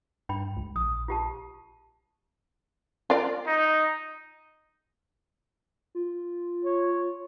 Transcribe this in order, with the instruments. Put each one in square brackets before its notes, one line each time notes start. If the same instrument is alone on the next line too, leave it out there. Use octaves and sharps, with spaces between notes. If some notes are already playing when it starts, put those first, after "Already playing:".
[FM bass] G2 [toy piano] G5 B5
[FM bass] C#2
[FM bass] A#1 [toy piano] D#6
[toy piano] F4 G4 A5
[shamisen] F4 D5
[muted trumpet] D#4
[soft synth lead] F4
[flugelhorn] C#5